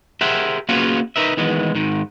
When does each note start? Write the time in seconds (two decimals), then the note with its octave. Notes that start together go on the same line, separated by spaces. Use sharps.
0.21 G4 G#4 A#4 C5 E5 F#5
0.69 A#3 B3 C#4 F4 F#4 G#4
1.16 D#4 A#4 B4 E5
1.37 D#3 E3 G#3 B3
1.75 G#2 D#3